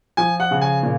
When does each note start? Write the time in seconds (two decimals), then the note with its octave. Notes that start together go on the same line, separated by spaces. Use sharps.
0.17 F3 G#5
0.40 F#5
0.51 C#3
0.61 G#5
0.83 A#2